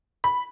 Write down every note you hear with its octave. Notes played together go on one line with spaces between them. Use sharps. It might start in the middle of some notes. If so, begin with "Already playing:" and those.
B5